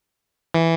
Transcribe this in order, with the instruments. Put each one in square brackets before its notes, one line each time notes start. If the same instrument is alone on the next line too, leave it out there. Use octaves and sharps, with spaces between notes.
[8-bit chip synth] E3